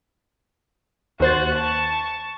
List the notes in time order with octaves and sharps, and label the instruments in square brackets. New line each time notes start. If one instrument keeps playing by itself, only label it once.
[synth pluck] D#2 C5 A6 [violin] F#4 F#6
[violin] A5 C#6